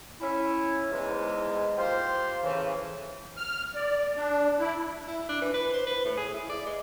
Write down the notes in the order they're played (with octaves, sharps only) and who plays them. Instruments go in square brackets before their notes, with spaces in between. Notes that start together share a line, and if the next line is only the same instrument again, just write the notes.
[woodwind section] C#4 E4
E2 G#2 G#3
A#3 F4 G4 C5
A2 C#3 E3
[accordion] F6
D5
D4
E4
[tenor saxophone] E4
D4
E3
B4
C5
B4
A2
G#4
E4
D5
G#3